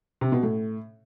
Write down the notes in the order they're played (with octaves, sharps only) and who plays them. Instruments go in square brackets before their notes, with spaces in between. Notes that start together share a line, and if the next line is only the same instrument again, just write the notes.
[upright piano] C3
B2
A2